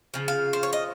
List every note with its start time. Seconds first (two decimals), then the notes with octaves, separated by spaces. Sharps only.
0.14 C#3 F3
0.28 F5
0.53 C5
0.63 C#5
0.73 D#5